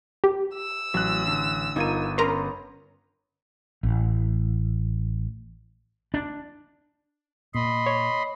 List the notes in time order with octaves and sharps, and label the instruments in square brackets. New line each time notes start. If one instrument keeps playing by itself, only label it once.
[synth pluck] G4
[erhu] E6
[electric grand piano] A1 F#6 [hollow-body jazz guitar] F#3
[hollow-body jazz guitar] D3
[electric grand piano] G1 G#6 D#7 [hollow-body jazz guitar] D#4 F4 A#4
[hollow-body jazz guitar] C#4 B4 [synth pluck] A#4 A#5 C6
[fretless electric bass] A1
D4
[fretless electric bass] A#2 [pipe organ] D#5 B5 C6
[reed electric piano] C#5